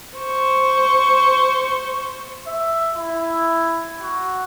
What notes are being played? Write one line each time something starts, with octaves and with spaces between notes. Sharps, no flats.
C5 C#6
E5
E4
F#4